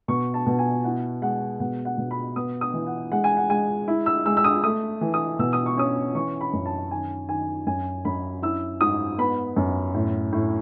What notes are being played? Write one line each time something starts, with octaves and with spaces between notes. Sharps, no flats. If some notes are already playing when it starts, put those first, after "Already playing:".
B2 C#6
A5
B2
G#5
E4 F#5
G#3 F#5
B2 F#5
F#5
B2
B5
B3 D#6
D#6
E3
F#5
G#3 F#5
G#5
F#5
G#3 G#5
E4
E6
G#3 E6
E6
D#6
A3 D#6
E3
D#6
B2 E6
D#6
C#6
C#4 D#6
E3 C#6
B5
F#2
A5
D#3 G#5
D#3 G#5
F#2 G#5
F#2 B5
E4 E6
G#2 D#6
B3 B5
F#2
A2
A2